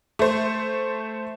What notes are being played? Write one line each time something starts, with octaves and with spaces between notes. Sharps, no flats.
A3 C5